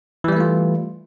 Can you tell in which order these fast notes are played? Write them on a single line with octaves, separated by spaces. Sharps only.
E3 G3 E4 A3 F4